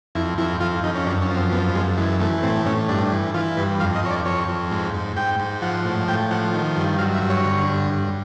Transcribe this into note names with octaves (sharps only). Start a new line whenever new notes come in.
F2 E4
F2 E4
F2 F4
F2 D#4
C#4
F#2 D4
C#4
F3
C4
F#2 B3
F#2 G#3
E3 G#3
E3 A3
A2 C4
A2 C#4
G2 D4
E3
E3 F4
G2 B4
F2 F5
D#5
F2 C#5
D5
F2 C#5
F2
G#2
G#2
G#2 G5
G#2
F3 F#5
A2
A2 G5
F3 F#5
D#3
G2
F#3 F5
E5
G2
C#5
D3
G2
G2